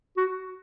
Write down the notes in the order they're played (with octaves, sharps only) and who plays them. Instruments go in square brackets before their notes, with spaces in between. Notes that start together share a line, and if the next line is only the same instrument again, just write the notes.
[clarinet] F#4